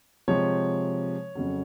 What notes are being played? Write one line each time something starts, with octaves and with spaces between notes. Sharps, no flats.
C3 F3 G#3 C#5
F2 C#3 F#3